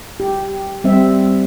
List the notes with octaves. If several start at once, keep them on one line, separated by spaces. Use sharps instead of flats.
G4
G3 C4 E5